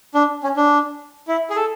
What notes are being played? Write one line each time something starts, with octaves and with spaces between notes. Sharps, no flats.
D4
C#4
D4
E4
G#4
A4